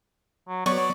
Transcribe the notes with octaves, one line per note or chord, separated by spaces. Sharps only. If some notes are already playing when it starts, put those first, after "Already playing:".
F#3
F#3 B3 C#5 D5 C#6